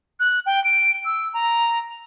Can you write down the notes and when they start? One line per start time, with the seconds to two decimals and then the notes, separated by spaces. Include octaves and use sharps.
0.20 F#6
0.46 G5
0.64 D7
1.05 E6
1.34 A#5